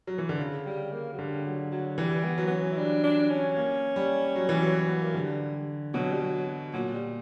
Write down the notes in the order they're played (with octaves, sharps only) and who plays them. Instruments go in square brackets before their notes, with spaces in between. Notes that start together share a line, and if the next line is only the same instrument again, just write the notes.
[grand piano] F#3
E3
D3
C#3
[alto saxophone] G3
A#3
F#3
[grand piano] D3 [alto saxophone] G3
[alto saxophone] F#3
F#3
[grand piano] E3 [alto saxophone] G3
[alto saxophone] B3
[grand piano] F#3
[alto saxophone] B3
C#4
E4
[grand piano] G3 [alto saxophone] D4
[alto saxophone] D4
C#4
[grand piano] A#3
G3
F#3
E3
F#3
[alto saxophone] B3
A#3
[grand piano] D3 [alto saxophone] G3
[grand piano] B2 [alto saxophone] F#3
[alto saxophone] G3
F#3
[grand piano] A#2 [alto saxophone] F#3
[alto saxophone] G3